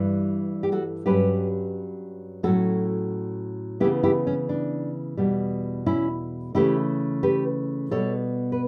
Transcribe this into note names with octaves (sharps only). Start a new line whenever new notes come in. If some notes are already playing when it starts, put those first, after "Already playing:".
Already playing: G2 E3 G3
G4
F#4 A4
G2 F#3 C#4 G4 B4
A2 F#3 C#4 F#4 A4
C#3 E3 B3 E4 G4
E4 G4
C#4
D4
E2 B2 G3
C#4 E4
C#3 E3 A3 C#4 E4 G4
G4 B4
B2 G3 B3 A4 C#5
B4